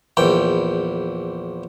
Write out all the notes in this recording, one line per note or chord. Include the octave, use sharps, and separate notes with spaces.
A#1 E2 G5